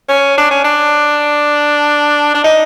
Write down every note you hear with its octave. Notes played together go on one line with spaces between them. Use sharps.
C#4
D4
C#4
D4
D4
D#4